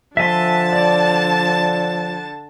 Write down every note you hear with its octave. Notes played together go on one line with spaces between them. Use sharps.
D3 F3 E5 G#5 A5 C6
D5